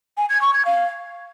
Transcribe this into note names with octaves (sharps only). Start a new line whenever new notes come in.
G#5
G#6
C#6
G#6
F5